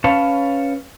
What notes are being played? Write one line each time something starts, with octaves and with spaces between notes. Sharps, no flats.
C#4 B4 C#5 F5 A5